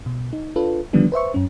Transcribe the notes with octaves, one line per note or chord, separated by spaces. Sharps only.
B2
D#4
D4 F4 A4 B4
D3 D#3 F3 G3 B3 D4
B4 C5 E5 C#6
F#2 C#4